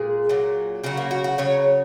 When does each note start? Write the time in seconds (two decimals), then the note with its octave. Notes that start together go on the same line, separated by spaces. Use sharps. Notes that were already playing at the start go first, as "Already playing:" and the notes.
Already playing: A#2 G#3 G#4
0.29 A#2 F#3
0.84 C#3 F#3 F#4
0.97 A#3
1.11 F#4
1.24 F#4
1.38 C#3 F#3 C#5